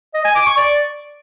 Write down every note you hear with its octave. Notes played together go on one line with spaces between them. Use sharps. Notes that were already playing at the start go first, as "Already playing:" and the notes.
D#5
G#5
D6
C#6
D5